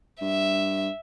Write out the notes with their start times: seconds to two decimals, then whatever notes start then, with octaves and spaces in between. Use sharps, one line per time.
0.21 G2 E5